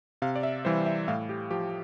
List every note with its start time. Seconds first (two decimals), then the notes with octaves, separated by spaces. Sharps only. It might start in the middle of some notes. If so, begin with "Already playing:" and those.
0.22 C3 F5
0.36 D5
0.43 E5
0.65 E3 G3 C5
0.86 E5
1.08 A2 F5
1.29 G4
1.51 F3 G4